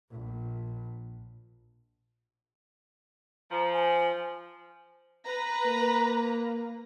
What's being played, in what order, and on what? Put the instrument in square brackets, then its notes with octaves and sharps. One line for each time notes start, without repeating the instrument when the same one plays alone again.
[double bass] A#1
[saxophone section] F3 [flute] A#5
[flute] G#5
[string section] B4 A#5
[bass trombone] A#3